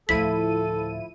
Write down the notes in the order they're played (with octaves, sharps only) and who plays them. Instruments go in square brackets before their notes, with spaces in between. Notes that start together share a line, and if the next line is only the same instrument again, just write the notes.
[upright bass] D2 A2 [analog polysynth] F3 E4 D#7 [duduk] A4 [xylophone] B6